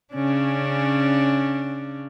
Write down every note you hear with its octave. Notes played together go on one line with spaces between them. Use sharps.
C#3 C#4 D4